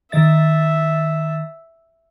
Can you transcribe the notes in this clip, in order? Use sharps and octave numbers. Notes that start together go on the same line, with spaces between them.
D#3 D#5 E5 A6